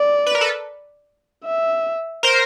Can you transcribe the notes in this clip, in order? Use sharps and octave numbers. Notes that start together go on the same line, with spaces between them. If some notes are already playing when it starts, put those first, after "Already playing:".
Already playing: D5
B4
A#4
A4 B4
E5
A#4 C5